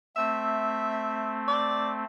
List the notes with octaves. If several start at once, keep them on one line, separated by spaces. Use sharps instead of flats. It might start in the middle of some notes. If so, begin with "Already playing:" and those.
A3 C4 E5
D5